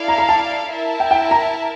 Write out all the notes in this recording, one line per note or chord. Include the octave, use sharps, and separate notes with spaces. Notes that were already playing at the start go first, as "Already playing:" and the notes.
Already playing: E4 A4 D5 F5
A#5
A#5
A5
E4 A#4 E5 A5
G5
G5
A#5